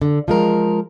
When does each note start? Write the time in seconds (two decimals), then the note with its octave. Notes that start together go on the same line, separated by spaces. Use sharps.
0.02 D3
0.28 F3 G#3 A#4